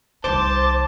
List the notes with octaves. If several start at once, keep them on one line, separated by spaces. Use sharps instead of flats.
C2 D#3 C5 A5 D6